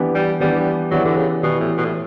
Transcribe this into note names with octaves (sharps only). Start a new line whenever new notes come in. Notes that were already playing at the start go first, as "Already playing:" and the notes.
Already playing: E3 B3 D4 G4
G3
E3 G3 B3 D4 G4
E3 F#3 B3 E4 G4 D5
D3
C#3
B2 E3 B3 E4 G4 D5
A2
B2
A2